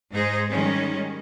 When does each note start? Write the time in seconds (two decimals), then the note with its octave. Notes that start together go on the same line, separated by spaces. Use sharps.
0.11 G#2 G#3 D#4 G#4 C5
0.51 D#3 G3 G#3 C#4